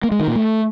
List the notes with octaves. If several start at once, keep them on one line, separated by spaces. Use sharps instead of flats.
A#3
G#3
D#3
A#2
A3